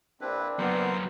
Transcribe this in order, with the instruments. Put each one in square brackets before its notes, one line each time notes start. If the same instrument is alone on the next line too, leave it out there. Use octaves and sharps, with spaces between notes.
[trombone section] A#1 [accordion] C4 D4 [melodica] E4 B4
[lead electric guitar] F#3 A#3 [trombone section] B3 [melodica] A#4 C5